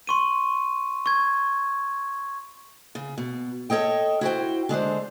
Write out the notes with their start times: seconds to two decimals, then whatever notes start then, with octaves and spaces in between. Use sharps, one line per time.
0.07 C6 C#6 D#7
1.06 C#6 G#6
2.95 C#3
3.18 B2
3.70 A4 C#5 D#5 G5
4.21 E4 F#4 C5 G5
4.69 D3 G#3 D4 C5